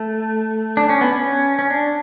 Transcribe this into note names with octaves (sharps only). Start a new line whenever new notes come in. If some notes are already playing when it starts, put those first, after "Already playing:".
Already playing: A3
D4
C#4
B3
C#4
C#4
D4